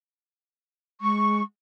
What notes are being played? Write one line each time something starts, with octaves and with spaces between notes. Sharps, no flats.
G#3 C#6